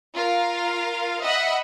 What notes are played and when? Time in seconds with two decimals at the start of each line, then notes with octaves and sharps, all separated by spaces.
0.15 F4 A#4 F5
1.21 D#5 E5 F#5 B5